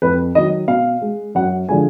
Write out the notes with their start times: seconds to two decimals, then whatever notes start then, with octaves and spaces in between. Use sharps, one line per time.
0.02 F2 B4
0.35 D#3 F#3 D#5
0.68 B2 F5
1.01 G#3
1.35 F#2 F#5
1.69 D3 F3 G#3 G#5